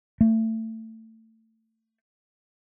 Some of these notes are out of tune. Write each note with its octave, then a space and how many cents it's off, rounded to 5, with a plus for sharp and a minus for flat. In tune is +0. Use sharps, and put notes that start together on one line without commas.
A3 +25